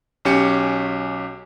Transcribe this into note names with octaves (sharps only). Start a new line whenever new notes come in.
B1 C#4 G4 C#7